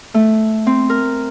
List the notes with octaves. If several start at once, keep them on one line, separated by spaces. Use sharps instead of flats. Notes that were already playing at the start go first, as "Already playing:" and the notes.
A3
C4
A#4